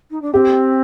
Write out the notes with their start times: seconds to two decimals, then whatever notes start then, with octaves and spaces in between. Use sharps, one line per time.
0.11 D#4
0.22 D4
0.34 C4 G4